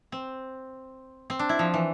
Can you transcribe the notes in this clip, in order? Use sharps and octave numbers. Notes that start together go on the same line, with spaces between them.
C4
C4
D4
E4
F3
E3